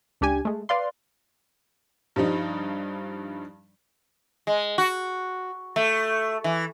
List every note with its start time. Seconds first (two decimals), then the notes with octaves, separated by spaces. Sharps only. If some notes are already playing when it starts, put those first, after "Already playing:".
0.21 C#2 D4 G4 G#5
0.45 G#3 A3
0.69 B4 D5 F5 C6
2.16 G2 F3 G3 D#4
4.47 G#3
4.78 F#4
5.76 A3
6.44 E3